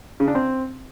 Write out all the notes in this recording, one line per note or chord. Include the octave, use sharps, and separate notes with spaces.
C#3
D4
C4